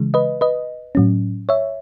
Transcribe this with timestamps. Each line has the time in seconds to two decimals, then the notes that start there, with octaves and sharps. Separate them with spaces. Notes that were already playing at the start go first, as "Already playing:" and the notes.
Already playing: C#3 E3 G#3
0.14 B4 D#5
0.41 B4 D#5
0.95 A2 F#3 C#4
1.49 C#5 E5